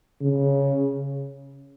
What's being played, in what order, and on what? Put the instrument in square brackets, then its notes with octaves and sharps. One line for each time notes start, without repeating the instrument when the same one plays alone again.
[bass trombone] C#3